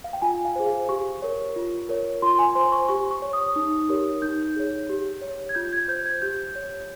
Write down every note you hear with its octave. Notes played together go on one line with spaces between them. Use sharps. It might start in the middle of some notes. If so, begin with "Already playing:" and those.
F5
G5
F4 G#5
F5
G#4 C5
F5
G4 C#6
A#4 C#5
F4
A#4 C#5
F4 C6
G#5
C5 C6
C#6
G4 C#6
C#6
C#5
D#6
D#4
G4 A#4 C#5
D#4 G6
G#4 C#5
G4
C#5
G#6
F4 G6
G#6
C5 G6
G#6
G4 G6
C#5